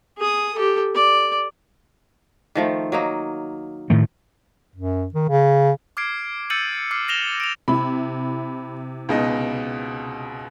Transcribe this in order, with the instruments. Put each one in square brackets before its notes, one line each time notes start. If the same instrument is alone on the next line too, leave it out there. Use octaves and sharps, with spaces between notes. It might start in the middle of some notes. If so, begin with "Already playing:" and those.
[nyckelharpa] G#4 D#6
G4 A4
D5
[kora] D#3 F3 A3
F#3 A#3 D#4
[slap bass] A2 D#3 A3
[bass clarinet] F#2
D#3
C#3
[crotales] D6 F6 G#6 C7 D7
E6 G6 A6 C#7 D#7 F#7
D6 F6 C7
F6 A#6 E7 F7 G7
D7 F7
[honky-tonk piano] C3 E4 [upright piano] B5
[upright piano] C#2 B2 D#4